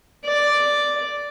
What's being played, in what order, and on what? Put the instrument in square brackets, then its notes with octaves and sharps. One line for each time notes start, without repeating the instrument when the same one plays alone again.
[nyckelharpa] D5